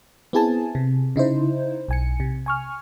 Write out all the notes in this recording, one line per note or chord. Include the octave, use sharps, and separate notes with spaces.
B3 C4 E4 G#4 G#5 A5
C3
C#3 D#4 E4 C5
B1 G#5 C#7
C3
G#5 C#6 F6